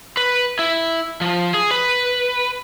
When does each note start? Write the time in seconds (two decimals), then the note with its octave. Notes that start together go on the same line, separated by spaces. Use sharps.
0.17 B4
0.59 E4
1.21 F3
1.54 G#4
1.71 B4